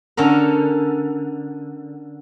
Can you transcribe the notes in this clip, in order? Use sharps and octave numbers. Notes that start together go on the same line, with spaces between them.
D3 C#4 A4 A#4